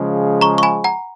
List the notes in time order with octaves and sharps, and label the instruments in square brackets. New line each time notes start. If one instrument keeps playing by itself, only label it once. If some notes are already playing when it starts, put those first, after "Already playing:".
Already playing: [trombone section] C#3 F3 G#3
[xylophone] A#5 C#6
C#6
G#5 B5
F#5 A#5